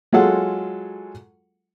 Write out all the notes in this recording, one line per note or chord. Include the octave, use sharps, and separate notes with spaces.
F#3 G#3 F4 G#4 A4 F#5